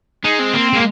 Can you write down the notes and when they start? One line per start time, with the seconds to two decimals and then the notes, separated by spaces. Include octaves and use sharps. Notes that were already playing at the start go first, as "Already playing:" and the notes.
0.24 G#3 D#4
0.39 C4
0.54 A#3 C4
0.73 G#3 A#3